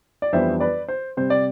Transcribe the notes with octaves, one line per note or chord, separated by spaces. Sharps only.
D5
F2 E3 G3 B3 D4 C5 E5
B4 D5
C5
C3 G3 C4 C5
D5